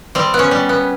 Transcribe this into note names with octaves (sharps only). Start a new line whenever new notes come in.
G3 C4
B3
C#4
G3
B3